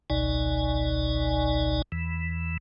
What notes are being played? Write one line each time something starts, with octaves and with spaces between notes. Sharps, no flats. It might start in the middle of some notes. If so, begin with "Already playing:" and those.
G#1 C#2 B2 D#4 D5 G#5
E2 E3